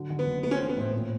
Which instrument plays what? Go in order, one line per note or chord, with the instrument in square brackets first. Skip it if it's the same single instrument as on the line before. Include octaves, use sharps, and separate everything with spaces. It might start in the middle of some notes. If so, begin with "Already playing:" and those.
Already playing: [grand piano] D3 F#3
D3
[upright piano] B3
[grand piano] F#1
[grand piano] A3 [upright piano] B3
[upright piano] C#4
[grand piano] E3 [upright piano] C4
[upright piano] B3
[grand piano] A2 [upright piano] C4
[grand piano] A#2